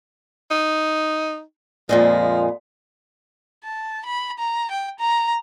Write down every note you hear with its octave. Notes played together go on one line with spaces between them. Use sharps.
D#4
F2 A#2 F3 G#3
A5
B5
A#5
G5
A#5